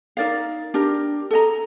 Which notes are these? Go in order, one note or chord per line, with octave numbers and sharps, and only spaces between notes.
D#4 A#4 D5 F5
D4 G4 A#4
A4 D#5 A#5